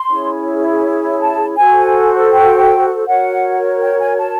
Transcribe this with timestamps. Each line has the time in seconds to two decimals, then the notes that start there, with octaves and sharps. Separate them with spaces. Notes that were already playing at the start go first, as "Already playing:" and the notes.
Already playing: C6
0.09 C#4 E4 G#4 C#5
1.20 A5
1.57 F#4 A4 C5 G#5
2.32 G5
3.07 F#4 A#4 C#5 F#5
3.81 G5
4.00 G#5
4.18 A5